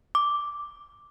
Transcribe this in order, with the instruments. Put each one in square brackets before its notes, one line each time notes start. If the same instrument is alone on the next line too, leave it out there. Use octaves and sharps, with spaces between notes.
[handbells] D6